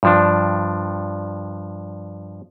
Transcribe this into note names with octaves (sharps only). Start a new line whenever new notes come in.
G2 F3 D4